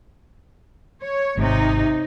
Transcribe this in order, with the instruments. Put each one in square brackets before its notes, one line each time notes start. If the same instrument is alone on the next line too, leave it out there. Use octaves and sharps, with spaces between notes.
[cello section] C#5
[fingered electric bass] G#1 [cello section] C3 D#4